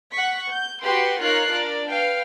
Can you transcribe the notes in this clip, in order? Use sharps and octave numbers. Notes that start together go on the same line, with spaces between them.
F#5 C#6 B6
G6
F#4 G4 B4 F#5 G5 C6
D#4 F4 A#4 C#5 F#6 C7
D4 A#4 D5
B4 F5 G5